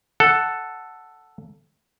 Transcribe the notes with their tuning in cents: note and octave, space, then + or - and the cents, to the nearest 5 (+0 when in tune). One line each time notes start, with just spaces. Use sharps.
A4 +0 F#5 +0